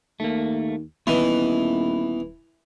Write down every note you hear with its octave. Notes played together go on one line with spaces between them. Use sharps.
D#2 A3 A#3
D#1 E3 B3 D#5